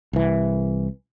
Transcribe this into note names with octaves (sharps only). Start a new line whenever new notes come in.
C2 E3